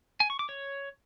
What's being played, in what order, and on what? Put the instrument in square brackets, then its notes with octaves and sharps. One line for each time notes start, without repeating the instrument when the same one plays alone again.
[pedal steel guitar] G#5
C#6
D6
C#5